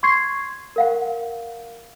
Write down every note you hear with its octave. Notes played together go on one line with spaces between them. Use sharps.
C6 C#6 G#6 C7
A#4 F5 F#5